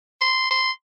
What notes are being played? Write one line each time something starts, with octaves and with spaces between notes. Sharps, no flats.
C6
C6